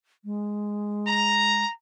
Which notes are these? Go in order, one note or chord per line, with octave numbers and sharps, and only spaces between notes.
G#3
A#5